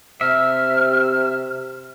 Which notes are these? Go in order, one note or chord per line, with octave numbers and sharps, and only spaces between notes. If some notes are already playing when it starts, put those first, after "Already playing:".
C3 E5 F6